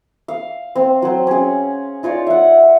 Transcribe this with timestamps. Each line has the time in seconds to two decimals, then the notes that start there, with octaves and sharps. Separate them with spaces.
0.28 F5
0.76 C4
1.02 F#3 C5
1.27 C#4 G#4
2.03 D#4 F4 C#5 D5
2.27 E5 F#5